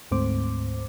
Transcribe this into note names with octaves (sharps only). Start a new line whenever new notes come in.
D2 G#2 A3 C4 C5 D6